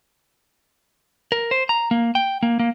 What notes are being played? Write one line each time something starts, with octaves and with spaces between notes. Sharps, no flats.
A#4
C5
A#5
A#3
G5
A#3
A#3